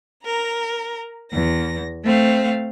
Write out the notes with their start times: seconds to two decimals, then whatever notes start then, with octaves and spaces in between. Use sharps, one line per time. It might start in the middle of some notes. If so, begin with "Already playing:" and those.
0.24 A#4 A#5
1.32 E2 A#6
2.04 A3 C4 F5